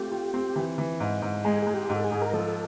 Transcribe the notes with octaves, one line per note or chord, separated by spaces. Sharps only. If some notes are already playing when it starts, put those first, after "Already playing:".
Already playing: A3 C4 F4 G4
F4
C4
E3
E3
G#2
G#2
G#3 G#4
G#3 G#4
G4
G#2
A4
G#4
G#2
A#4
F3 A4